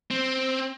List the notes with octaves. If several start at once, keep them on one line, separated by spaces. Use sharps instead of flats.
C4